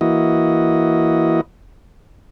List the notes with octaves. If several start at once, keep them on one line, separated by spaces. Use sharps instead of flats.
E3 A#3 E4 F#4 D#5